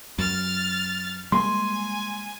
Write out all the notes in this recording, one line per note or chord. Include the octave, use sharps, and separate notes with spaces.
F#2 F6 A6
G3 G#3 A#3 G#5 C6